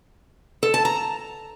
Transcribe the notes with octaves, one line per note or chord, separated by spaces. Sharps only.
A4
A5
A#5